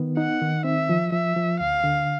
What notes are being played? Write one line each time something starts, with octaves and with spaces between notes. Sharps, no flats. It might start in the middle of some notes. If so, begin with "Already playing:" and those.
Already playing: D#3 B3
D#4 F#5
D#3
C4 E5
F3
F3 E5
F3
D2 F5
D3